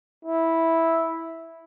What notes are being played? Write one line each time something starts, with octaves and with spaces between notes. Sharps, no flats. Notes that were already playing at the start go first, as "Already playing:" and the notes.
E4